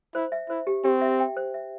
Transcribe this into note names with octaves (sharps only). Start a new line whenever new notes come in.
E4 C5
E5
E4 C5
G4
C4 G4
E5
G5
C5
E5